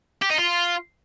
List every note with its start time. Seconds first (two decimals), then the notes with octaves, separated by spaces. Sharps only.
0.22 G4
0.30 D#4
0.38 F4